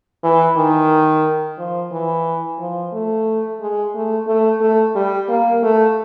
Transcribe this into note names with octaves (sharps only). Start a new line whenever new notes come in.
E3
D#3
F3
E3
F3
A3
G#3
A3
A3
A3
G3
A#3
A3